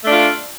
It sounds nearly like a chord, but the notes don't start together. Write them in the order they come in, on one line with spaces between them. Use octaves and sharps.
A3 D4 F4